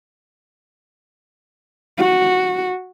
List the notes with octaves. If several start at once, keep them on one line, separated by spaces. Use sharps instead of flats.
F#4